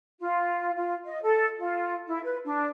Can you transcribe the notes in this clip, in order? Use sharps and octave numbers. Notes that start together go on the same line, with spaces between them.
F4
F4
D#5
A4
F4
E4
B4
D4